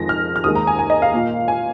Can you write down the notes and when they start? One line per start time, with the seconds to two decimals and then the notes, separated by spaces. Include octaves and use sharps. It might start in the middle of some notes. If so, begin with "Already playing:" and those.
Already playing: F2 D#3 G#3 A#6
0.09 F6
0.36 F6
0.44 D#2 D#3 G#3 D#6
0.55 A#5
0.67 G#5
0.79 G#5
0.90 D#5
1.02 F5
1.13 A#2 A#3
1.48 G#5